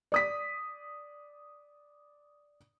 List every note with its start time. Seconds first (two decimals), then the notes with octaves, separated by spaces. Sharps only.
0.12 D5 D#6 B6